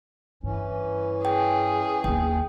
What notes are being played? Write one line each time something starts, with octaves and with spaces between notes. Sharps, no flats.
G2 E3 C#4
G#4 G5
D#2 A#3 G5